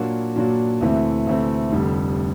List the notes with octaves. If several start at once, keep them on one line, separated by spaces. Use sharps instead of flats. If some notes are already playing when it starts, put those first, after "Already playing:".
Already playing: A#2 F#3 A#3 D4 F#4
A#2 F#3 A#3 D4 F#4
D2 C3 E3 A3 C4
D2 C3 E3 A3 C4
F1 F2 D3 G3